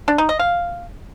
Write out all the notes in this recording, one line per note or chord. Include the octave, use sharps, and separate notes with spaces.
D4
D#4
D#5
F5